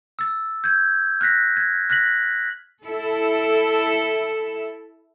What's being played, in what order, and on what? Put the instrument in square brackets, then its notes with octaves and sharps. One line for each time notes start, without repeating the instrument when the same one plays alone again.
[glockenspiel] E6 A6
G6 G#6
F6 F#6 A#6 B6
G#6
F6 F#6 A#6 B6 F#7
[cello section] E4 A4